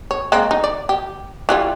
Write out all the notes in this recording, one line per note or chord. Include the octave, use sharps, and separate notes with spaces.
C#5
G#3 A#3 C4
D#4
D5
G4
E3 G3 F4